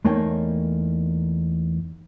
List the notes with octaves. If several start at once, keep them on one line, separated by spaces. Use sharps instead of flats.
E2 A3 A#3 D#4 C#5 G5